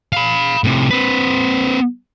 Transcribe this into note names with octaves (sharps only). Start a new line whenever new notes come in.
F5 B5
A2 C3
C4 B4